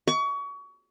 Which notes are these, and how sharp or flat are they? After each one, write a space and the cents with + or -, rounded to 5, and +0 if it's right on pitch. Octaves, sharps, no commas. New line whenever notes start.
C#6 +30